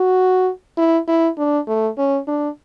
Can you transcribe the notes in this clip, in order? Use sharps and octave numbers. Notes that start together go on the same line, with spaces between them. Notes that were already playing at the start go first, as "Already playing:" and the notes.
Already playing: F#4
E4
E4
D4
A3
C#4
D4